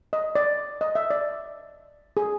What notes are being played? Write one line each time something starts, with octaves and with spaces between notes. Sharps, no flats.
D#5
D5
D#5
E5
D5
G#4